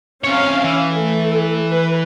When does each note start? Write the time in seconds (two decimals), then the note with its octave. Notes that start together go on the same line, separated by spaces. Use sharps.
0.24 C3 C#4 C#5 F5
0.64 E3
0.94 A3 A4
1.73 B4